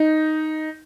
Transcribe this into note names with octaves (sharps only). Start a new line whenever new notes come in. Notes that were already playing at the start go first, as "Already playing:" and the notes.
Already playing: D#4